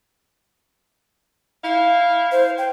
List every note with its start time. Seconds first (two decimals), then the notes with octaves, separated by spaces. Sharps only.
1.63 E4 F5
2.32 C5
2.58 G5